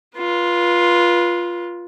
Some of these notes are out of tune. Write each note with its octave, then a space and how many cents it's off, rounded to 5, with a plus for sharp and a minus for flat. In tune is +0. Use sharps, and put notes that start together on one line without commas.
F4 +0 B4 -30